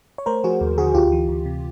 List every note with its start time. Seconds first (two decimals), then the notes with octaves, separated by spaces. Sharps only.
0.18 C#5
0.26 A3 A#4 C5
0.44 F3 F#4 G#4
0.61 D#2
0.78 D3 F#4 G#4
0.94 D2 F4 G4
1.12 E3
1.28 D2
1.46 C3